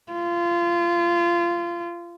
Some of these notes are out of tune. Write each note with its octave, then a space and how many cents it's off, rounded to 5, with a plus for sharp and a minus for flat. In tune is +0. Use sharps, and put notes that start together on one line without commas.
F4 -25